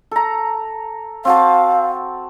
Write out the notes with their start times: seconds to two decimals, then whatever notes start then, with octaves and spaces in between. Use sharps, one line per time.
0.11 A4 A#5
1.25 C4 F#4 F5 A5